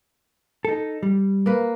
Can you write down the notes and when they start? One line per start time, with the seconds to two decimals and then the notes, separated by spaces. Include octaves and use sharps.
0.65 D#4 A4
1.03 G3
1.46 A#3 B4